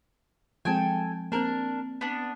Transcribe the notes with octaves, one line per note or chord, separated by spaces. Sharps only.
F3 G#3 C4 A4 G5 G#5
A#3 C4 D4 A#4
B3 D4